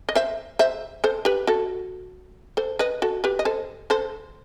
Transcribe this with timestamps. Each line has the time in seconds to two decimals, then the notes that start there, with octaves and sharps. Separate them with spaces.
0.09 D#5
0.15 C5 E5
0.59 C5 E5
1.04 A4 C5
1.25 G4 B4
1.47 F#4 A4
2.57 A4 C5
2.79 B4 D#5
3.02 F#4 A4
3.24 G4 B4
3.39 D#5
3.45 A4 C5
3.90 A4 C5